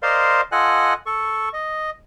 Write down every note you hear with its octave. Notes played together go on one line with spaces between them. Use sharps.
A#4 C5 D5 D#5 F5 C6
F4 A4 D#5 F#5 G#5 F#6
A4 C#6
D#5